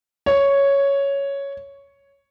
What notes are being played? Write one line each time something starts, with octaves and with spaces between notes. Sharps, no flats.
C#5